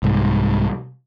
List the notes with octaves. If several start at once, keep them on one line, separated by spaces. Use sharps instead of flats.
C2 G#2